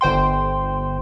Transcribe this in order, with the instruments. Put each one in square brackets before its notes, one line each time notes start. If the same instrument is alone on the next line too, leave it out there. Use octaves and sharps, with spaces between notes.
[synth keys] G1 C5 G5 C6